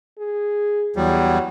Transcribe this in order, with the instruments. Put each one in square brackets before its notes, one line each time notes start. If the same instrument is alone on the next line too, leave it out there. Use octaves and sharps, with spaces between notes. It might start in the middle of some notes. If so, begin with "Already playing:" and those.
[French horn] G#4
[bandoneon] E2 G3 [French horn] F#3